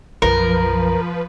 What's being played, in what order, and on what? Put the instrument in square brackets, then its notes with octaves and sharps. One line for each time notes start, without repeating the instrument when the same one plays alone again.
[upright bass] B1 F#2 [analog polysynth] F3 B4 [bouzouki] A#4